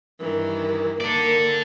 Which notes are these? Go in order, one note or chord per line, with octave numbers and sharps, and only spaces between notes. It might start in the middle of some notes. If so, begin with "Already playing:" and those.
G2 D#3 E3
D#3 A#3 A4 D5